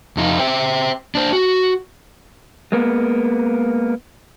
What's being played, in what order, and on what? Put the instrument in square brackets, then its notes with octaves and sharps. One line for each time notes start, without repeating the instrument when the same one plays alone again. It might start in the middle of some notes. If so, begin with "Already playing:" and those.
[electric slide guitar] F2 D#4 F4
C5 E5 G5
D4 C5
F#4
G#3 A#3 B3